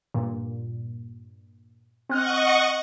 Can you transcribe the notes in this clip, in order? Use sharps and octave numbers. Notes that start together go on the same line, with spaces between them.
G2 A#2
C4 D#5 F#5 C#6 F6 F#6